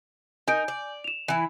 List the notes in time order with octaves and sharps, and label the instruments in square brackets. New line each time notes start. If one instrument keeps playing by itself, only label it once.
[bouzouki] D#4 A#4 [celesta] G#5 G6 D7
[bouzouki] D5
[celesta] E7 F7
[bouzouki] E3 E4